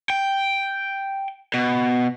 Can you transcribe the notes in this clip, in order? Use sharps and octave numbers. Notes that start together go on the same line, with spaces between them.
G5
B2